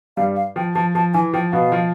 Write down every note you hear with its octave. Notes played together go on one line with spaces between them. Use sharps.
G2 G3 F5
F5
F3 G5
F3 A5
F3 A5
E3 G#5
F3 G5
B2 B3 F5
F3 F4